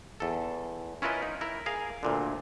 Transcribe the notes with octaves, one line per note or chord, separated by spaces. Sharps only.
E2 A4
C#4 E4 F4 A#4 B4 D#5
D#4
E4 A#4
G#4 A#4 F5
D2 A#2 D3